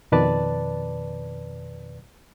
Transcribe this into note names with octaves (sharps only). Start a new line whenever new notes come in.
F2 B2 D#3 B4 D5 A5